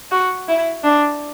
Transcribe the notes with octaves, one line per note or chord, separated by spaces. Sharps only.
F#4
E4
D4